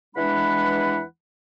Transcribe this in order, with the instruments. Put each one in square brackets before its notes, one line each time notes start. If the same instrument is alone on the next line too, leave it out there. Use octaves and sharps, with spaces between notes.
[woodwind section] E2 E3 G#3 D4 F#5 B5